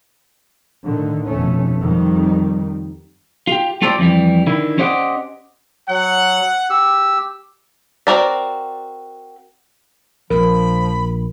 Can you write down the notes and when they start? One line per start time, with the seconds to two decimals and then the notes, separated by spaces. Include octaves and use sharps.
0.84 A2 D3 D#3
1.25 F1 B2 A3 C#4
1.80 F2 D#3 G3
3.47 F4 G4
3.82 A3 F4 G4 A4 C5 D5
3.99 F2 E3 G3
4.47 D3 D#3 E4
4.78 C#4 G4 C5 D5 D#5 F#5
5.89 F#3 F#5
6.70 G4 E6
8.07 C4 F#4 A#4 D5
10.30 A#1 F3 A#4 B5